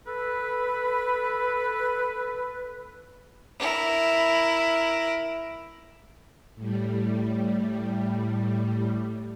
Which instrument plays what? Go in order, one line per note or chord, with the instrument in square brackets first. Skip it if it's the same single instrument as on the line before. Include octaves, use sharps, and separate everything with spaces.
[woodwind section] A4 B4
[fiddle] E4 A#4
[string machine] A2 G3